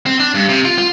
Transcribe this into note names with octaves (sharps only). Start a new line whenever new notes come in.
C4
D4
G2
C3
F4
F4